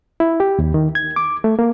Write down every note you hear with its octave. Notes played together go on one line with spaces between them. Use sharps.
E4
G4
D#2
D#3
G#6
D6
A3
A#3